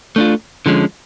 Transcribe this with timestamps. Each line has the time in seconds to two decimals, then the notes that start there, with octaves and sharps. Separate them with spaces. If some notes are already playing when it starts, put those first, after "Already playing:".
0.16 A3 D4 F4
0.66 D3 F3 G#3 C#4